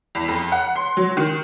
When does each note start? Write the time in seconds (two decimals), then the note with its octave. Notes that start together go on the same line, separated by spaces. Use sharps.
0.15 E2
0.28 F2
0.52 F#5
0.76 C6
0.97 F#3
1.17 D#3